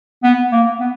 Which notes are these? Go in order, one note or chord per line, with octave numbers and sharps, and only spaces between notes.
B3
A#3
B3